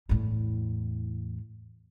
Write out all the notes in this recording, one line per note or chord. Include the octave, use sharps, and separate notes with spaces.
E2 A2